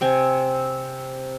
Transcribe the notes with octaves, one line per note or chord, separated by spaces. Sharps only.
C3 C4 G#5